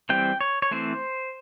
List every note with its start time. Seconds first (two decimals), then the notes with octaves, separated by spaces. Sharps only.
0.09 E3 G3 C4 G5
0.41 C#5
0.62 C#5
0.71 E3 A3 C4 C5